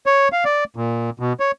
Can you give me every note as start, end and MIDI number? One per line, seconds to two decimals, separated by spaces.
0.06 0.28 73
0.33 0.44 77
0.45 0.64 74
0.76 1.10 46
1.19 1.33 47
1.40 1.51 73